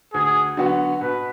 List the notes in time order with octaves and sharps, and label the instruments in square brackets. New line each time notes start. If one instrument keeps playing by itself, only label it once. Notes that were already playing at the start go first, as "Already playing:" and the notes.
[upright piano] D2 [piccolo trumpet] G#4
[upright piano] D3 F#3 B3 F#4
[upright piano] B2 [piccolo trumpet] B4